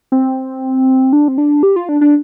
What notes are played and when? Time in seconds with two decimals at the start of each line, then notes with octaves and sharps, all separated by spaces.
0.12 C4
1.13 D4
1.28 C4
1.38 D4
1.63 G4
1.76 F4
1.89 D4
2.01 D4